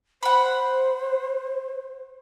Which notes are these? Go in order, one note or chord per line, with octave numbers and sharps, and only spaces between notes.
C5 F#5 B5